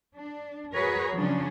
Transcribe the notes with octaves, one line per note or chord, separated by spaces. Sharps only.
D4
F#4 G#4 A#4 B4 C#5
C#3 F3 F#3 C#4 D4